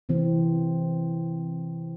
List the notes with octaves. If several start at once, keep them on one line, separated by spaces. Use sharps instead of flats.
C3 E3 C4